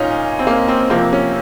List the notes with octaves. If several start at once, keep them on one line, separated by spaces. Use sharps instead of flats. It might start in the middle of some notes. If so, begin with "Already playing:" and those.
Already playing: A#2 C#4 D#4 F4
C4
A#3
C4
C3 F3 A#3 C4
C#4